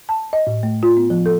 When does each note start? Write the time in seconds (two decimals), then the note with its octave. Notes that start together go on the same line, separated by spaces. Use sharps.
0.09 A5
0.33 D#5
0.47 A2
0.63 A3
0.83 F4
0.97 B3
1.10 F3
1.26 A4